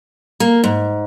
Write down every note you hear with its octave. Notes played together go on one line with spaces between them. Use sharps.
A#3
G#2